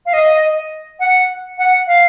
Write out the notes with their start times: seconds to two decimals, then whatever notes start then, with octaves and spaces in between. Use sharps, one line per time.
0.06 F5
0.13 D#5
1.00 F#5
1.58 F#5
1.87 F5